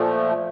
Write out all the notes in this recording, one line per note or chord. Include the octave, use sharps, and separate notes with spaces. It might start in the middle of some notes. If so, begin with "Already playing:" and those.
Already playing: A#2 F3 A3